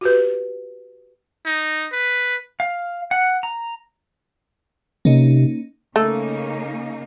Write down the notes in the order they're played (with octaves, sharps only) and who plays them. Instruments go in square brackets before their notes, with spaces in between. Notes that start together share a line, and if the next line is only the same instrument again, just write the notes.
[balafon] F#4 G4 B4
[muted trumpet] D#4
B4
[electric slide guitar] F5
F#5
A#5
[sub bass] C3 [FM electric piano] A#3 C#4 D#4
[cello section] C#3 A#3 D#4 [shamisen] A3